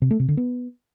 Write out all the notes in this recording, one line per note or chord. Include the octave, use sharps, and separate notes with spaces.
C3
A3
C3
D3
B3